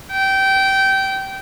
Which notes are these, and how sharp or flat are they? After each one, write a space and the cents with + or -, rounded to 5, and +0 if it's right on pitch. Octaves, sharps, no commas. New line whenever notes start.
G5 -20